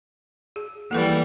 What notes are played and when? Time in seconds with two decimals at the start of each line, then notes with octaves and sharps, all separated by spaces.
0.56 G#4
0.91 E3 G3 A#3 A4 B4